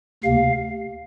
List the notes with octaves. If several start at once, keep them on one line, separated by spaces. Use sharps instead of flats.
D2 C3 A#3 F5